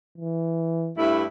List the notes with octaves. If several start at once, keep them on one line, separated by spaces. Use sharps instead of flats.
E3
G2 A3 E4